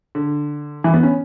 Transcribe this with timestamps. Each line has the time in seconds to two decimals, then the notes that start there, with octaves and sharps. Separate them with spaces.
0.15 D3
0.84 E3
0.94 B3
1.03 C#4